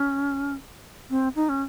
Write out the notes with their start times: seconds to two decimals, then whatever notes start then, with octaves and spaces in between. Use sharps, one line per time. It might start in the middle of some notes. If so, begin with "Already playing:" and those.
Already playing: C#4
1.10 C4
1.35 D#4
1.49 C#4